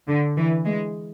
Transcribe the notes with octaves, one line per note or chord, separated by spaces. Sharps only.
D3
E3
G#3